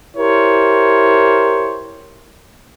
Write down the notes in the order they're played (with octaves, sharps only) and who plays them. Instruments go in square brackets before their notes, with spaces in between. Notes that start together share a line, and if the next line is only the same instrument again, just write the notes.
[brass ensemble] E4 G4 A#4 C5 C#5